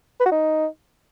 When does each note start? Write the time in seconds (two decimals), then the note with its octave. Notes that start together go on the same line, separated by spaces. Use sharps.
0.20 B4
0.26 F#4
0.31 D#4